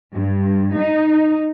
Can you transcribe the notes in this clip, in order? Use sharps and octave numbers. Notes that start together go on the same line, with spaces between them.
G2
D#4